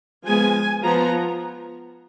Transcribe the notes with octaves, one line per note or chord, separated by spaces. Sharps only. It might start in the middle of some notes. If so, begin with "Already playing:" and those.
F3 G#3 B3 G#5
F3 B3 A#5